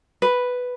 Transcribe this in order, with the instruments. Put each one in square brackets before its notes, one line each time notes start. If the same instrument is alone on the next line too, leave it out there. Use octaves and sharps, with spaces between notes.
[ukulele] B4